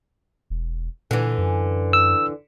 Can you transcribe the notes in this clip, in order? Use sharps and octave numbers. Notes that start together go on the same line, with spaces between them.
E1
A#2 D3 E3
F#2
E6